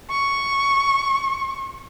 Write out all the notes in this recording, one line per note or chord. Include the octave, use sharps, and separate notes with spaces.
C#6